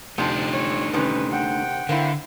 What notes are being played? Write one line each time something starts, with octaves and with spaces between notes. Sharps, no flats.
C3 F3 A3 D4 D#4
C#5
C3 D#3 C#4 B4
F#5 G5
D3 A#3 C4 E4